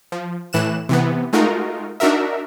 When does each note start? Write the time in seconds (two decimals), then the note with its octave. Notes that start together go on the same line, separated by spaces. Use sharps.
0.12 F3
0.53 A2 E3 F#6 E7
0.89 C3 E3 B3
1.33 G#3 A3 D#4 F4 F#4 A#4
2.00 D4 D#4 F#4 A#4 E5